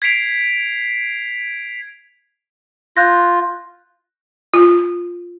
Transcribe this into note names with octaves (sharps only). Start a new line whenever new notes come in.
G#6 B6 C7 D7 F7
F4 F#6 G6 A#6
F4